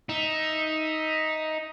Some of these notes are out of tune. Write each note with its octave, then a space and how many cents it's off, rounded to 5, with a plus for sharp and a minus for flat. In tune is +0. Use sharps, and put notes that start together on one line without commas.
D#4 +10 E5 +0